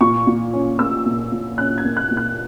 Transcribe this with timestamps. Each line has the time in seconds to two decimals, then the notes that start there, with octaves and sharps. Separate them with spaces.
0.01 A#2 C#6
0.27 A#2
0.54 C#4
0.79 A#3 E6
1.06 A#2
1.32 A#2
1.58 C#4 F#6
1.78 G#6
1.85 A#3
1.96 F#6
2.11 A#2
2.17 F#6